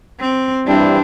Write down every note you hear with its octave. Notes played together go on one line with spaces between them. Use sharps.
C4
G2 E3 G3 C4 D4 E4